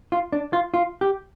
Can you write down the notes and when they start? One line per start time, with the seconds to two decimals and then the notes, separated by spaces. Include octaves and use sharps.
0.12 F4
0.32 D4
0.53 F4
0.74 F4
1.01 G4